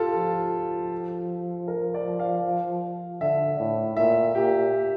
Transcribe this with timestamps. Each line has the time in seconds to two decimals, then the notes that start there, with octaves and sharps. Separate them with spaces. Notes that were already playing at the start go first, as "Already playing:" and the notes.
Already playing: F4 G4 A4
0.16 F3
1.68 A#4
1.94 D5
2.19 F5
3.21 D3 E5
3.59 A2
3.97 A#2 E5
4.35 A#2 G4